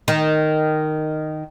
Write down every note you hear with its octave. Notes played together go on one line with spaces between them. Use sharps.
D#3